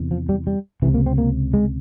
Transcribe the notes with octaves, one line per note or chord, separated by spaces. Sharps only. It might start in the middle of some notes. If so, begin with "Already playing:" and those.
Already playing: E2 C3
F3
G3
G3
C#2 C3 E3
A#3
C4
A#3
G#3